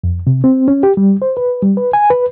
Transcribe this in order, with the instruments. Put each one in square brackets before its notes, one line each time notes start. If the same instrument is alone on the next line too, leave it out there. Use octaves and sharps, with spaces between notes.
[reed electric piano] F2
C3
C4
C#4
G4
G3
C5
B4
G3
B4
G#5
B4